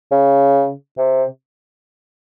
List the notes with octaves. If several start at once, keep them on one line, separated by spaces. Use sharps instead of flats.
C#3
C3